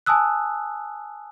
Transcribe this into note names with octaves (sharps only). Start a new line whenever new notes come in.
G#5 A5 D#6 E6 F#6